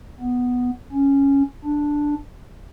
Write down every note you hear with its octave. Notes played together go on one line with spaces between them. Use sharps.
B3
C#4
D4